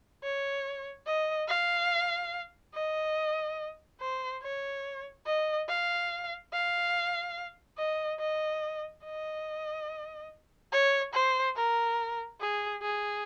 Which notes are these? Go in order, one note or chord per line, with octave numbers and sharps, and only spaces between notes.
C#5
D#5
F5
D#5
C5
C#5
D#5
F5
F5
D#5
D#5
D#5
C#5
C5
A#4
G#4
G#4